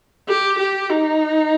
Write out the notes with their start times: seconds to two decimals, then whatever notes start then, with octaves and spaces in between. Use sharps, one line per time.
0.29 G4
0.59 G4
0.90 D#4